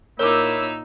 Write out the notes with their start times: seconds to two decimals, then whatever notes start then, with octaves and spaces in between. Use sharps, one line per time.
0.19 A#2 D#4 E4 A#4 C#5 D6 E6